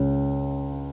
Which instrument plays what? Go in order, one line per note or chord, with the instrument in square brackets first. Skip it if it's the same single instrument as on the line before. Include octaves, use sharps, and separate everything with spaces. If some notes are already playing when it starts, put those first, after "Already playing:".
Already playing: [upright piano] C#2 C#3